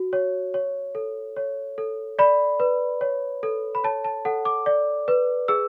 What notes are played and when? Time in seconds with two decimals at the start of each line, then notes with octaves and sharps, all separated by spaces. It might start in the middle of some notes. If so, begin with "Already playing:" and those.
Already playing: F#4
0.13 C#5
0.54 C#5
0.95 A4
1.36 C#5
1.78 A4
2.19 D5 B5
2.60 B4
3.01 C#5
3.43 A4
3.75 B5
3.84 C#5 A5
4.04 A5
4.25 A4 F#5
4.45 D6
4.66 D5
5.08 B4
5.48 G#4 E6